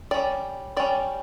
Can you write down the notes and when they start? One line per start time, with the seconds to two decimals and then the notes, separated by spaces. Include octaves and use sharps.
0.11 G3 C#4 D5
0.77 G3 C#4 D5